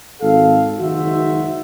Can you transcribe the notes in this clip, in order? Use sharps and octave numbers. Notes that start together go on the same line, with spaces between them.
G#1 A4 F5
F#1 D#3 G#3 F#4 C5 E5